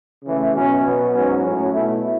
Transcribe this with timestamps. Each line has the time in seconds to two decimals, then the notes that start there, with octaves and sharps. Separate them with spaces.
0.24 C#3 E3 A3
0.54 B2 F#3 C#4
0.84 B2 F#3 B3
1.14 G#2 F#3 C#4
1.44 A2 F#3 C#4
1.73 B2 A3 E4